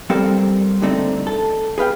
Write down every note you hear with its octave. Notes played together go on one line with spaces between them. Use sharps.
G3 C4 A4 A#4 C5 F5
G2 D3 A3 C4 D#4
A4
G#4 B4 F5 G5